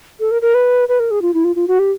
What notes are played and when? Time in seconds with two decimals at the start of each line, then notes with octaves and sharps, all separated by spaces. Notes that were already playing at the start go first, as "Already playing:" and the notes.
0.20 A4
0.31 A#4
0.42 A#4
0.54 B4
0.88 B4
1.00 A#4
1.11 G#4
1.22 F4
1.34 E4
1.44 F4
1.56 F4
1.68 F#4
1.79 G4